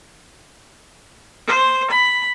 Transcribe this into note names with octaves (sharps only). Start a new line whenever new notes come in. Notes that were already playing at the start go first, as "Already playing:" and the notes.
C5
B5